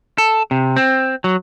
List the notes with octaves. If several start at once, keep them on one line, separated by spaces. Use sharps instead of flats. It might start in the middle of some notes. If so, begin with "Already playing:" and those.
A4
C3
C4
F#3